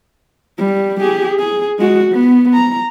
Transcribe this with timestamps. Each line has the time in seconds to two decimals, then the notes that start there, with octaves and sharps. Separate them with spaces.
0.58 G3
1.01 G4 G#4
1.39 G#4
1.79 G#3 F#4
2.12 B3
2.54 A#5